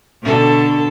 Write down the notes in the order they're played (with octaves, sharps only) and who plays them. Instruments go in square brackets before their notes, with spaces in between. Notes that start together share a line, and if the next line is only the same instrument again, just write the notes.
[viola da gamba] B2 D3 A4